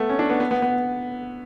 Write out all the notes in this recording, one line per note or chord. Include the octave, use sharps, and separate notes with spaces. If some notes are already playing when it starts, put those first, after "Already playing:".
Already playing: A3 B3
C#4
D4
B3
B3
B3
B3